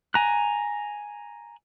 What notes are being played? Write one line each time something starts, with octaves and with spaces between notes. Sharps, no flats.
G#5 A#5 F#6